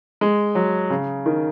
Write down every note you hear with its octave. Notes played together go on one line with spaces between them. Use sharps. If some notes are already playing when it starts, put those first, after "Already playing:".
G#3
F#3
C#3
D#3